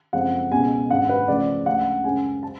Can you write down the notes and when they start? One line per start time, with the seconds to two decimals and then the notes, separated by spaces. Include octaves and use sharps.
0.13 F#1 F2 F3 G#3 F#5
0.51 C#2 B2 G#3 G#5
0.89 G#1 F#2 D3 G#3 F#5
1.09 B4
1.28 C#2 C#3 F3 A3 D5
1.66 D2 C#3 G#3 F#5
2.04 F#2 C#3 G#3 G#5
2.43 A5